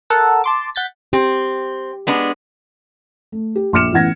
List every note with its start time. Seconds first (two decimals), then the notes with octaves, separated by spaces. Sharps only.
0.10 A4 A#4 F#5 A5 E6
0.44 A5 C6 D6
0.75 F#5 G6 A6 B6
1.13 C4 G4
2.07 G#3 B3 D4
3.32 A3
3.55 G4
3.73 A#1 C6 D6 F6 C#7 E7
3.92 A1 E3 B3 F#5 G#6 A#6